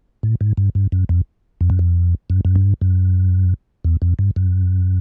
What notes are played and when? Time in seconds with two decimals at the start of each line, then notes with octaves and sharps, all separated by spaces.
0.23 A2
0.41 G#2
0.57 G2
0.75 G2
0.92 F#2
1.09 F2
1.61 F2
1.70 F#2
1.79 F2
2.30 F#2
2.45 F#2
2.56 G2
2.81 F#2
3.85 E2
4.02 F2
4.19 G2
4.36 F#2